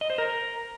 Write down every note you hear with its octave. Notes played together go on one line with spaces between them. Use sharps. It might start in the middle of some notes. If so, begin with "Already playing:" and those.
D#5
C5
A#4